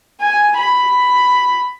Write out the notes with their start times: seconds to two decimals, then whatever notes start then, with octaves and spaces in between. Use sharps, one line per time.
0.21 G#5
0.58 B5